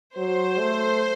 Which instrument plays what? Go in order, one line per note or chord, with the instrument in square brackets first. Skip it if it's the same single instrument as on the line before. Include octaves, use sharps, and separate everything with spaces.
[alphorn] F#3 [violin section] C5
[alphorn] A3